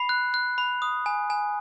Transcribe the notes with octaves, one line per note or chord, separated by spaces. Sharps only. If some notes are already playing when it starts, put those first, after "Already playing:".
Already playing: B5 C7
F#6
F#6
B5
D#6
G#5
G#5